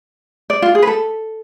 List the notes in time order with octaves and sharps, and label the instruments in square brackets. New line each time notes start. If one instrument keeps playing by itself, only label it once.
[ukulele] D5
F4
G#4
B4
A4